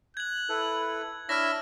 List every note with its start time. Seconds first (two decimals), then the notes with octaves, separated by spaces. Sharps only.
0.17 F#6 G#6 F#7
0.49 E4 A4 B4
1.29 D4 E4 C#5 E5 F6 A#6